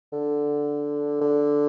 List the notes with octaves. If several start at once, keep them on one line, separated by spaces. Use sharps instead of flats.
D3
D3